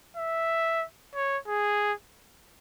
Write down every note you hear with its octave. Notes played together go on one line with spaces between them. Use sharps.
E5
C#5
G#4